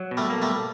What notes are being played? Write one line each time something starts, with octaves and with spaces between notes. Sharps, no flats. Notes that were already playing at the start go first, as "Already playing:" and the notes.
Already playing: F#3
B2
G3 A3
A#3
G3 A3